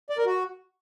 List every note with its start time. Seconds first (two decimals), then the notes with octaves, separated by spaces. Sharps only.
0.10 D5
0.18 A#4
0.26 F#4